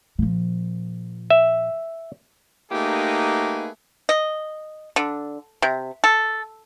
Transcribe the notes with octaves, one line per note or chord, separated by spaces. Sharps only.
A#2 F3
E5
A3 A#3 D#4 G4 G#4 B4
D#5
D3
C3
A4